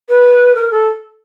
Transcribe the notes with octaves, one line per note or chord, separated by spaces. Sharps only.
B4
A#4
A4